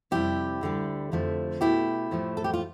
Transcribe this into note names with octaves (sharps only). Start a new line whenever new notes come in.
F2 C3 G3 E4 G4
D2 D3 G3
F2 D3 F3 A3
B2 A3 E4 G4
A2 F3 A3
A4
G4
F4